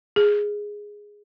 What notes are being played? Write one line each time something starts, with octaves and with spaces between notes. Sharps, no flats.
G#4